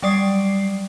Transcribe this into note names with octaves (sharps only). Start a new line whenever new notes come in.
F#3 G3 D5 D#6 C7